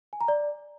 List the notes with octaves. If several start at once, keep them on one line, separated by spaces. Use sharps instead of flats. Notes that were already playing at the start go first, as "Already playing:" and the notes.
G#5
A#5
D5